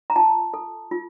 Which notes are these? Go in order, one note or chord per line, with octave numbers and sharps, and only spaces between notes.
A#5
F4 A5
A4
F4